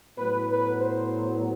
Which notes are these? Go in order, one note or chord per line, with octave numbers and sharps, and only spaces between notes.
A2 F#3 B3 B4
B4
C5